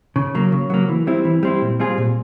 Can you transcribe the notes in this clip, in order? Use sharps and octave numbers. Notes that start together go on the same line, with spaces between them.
C#3
F#3 A#3
C#3
F#3 A#3
E3
G3 C4 E4
E3
G3 C4 E4
A#2
G3 C4 F4 G#4
A#2